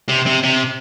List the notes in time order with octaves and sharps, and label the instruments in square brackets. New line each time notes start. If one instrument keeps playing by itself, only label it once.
[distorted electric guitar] C3
C3
C3